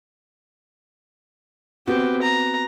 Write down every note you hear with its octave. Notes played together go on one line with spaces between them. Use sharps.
B3 C4 F#4 G4
A#5